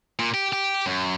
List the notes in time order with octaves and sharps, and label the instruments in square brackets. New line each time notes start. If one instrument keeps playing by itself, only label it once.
[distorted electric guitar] A#2
G4
G4
F#2